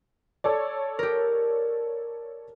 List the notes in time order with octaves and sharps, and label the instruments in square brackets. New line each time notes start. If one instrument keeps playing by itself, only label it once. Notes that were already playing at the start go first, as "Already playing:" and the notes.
[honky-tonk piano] A4 C#5 D5
[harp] G4 A#4